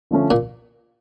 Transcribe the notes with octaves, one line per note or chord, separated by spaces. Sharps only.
D3 F3 A3 C#4
A#2